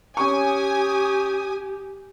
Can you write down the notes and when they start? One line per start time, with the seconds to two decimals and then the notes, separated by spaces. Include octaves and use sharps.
0.17 C#4 G4 G#5 C#6 D#6